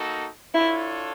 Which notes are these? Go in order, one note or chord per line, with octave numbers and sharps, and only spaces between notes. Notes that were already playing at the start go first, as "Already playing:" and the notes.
Already playing: A#3 D#4 F#4 A4
D4 E4 F4 A4 C#5